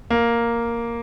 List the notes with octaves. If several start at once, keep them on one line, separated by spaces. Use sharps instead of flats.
A#3